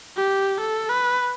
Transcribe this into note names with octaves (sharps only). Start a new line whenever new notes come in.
G4
A4
B4